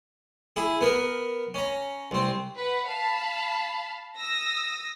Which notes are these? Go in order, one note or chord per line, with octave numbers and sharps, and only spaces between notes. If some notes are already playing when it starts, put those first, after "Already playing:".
E4 G#4
B3 A#4 B4
C#4 A#5
C2 C4
B4 F#5
F5 A5 B5
D#6 E6 A#6